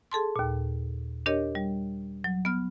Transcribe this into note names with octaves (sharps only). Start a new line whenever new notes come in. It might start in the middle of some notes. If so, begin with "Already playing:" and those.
G#4 A4 A5 C6
D#2 A#2
D4 G4 A#4 C#5 D#5
G3
F#3
B3 F6